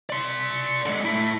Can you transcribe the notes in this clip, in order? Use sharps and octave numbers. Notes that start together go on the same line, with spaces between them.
D5 C6
D3 G#3
A3 E4